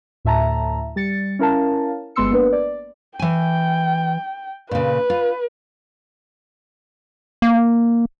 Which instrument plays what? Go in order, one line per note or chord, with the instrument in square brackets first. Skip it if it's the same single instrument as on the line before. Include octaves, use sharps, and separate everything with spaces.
[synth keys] D2 A2 E5 A5 A#5
G3 A6 C#7
C#4 E4 A#4 F5 A5
G1 G#3 B3 C6 E6 C#7
A#3 B3 D4 B4
D5
[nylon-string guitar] E3 G#5 [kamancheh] G5
[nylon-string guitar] A#2 C#3 [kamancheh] B4
[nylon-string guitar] F4
[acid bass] A#3